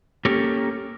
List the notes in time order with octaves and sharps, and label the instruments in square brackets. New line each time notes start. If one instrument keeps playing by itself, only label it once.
[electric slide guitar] A#3 C#4 G4 A4 A#4